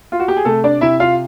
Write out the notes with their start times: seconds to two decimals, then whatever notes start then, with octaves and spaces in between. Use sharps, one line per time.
0.12 F4
0.20 F#4
0.28 G4
0.37 G#4
0.45 C3 A3 A4
0.64 D4 D5
0.81 C3 E4 E5
1.00 F4 F5